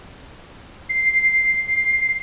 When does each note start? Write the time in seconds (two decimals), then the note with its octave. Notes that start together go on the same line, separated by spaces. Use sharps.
0.89 C7